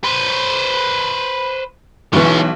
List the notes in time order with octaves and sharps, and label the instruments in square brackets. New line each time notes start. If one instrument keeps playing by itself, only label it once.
[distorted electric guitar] B4 C5
[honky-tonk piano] B1 E3 [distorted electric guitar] G#3 C#4